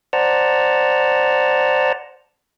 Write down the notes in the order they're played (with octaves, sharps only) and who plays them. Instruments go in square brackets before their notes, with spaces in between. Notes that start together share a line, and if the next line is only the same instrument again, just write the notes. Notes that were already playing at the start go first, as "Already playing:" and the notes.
[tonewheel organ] C5 D5 F#5 A5 A#5